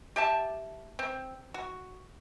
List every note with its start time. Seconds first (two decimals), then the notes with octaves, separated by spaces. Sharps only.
0.16 G4 E5 A5
0.99 C4
1.54 F#4